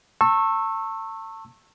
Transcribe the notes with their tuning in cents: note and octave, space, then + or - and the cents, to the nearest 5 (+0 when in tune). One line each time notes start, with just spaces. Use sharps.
A5 +35 C#6 -25 E6 +0